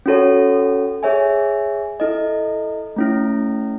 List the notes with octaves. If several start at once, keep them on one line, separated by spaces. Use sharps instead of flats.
C#4 F#4 A4 C#5
G#4 C#5 E5 G#5
E4 A4 D#5
A3 C#4 E4